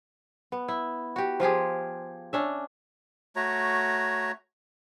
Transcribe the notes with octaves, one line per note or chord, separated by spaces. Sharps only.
B3
E4
F#4 G4
F3 F4 G4 G#4
C#4 D4 E5
A3 F#4 C#5 A#5